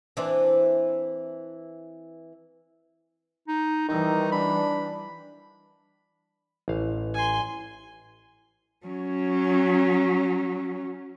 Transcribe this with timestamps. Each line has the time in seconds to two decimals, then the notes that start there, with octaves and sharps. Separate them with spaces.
0.17 E3 C4 D4
3.48 D#4
3.89 D#3 E3 G3 D#4
4.32 D4 B5
6.68 A1 F5
7.14 G#5 C6
8.86 F#3 C#4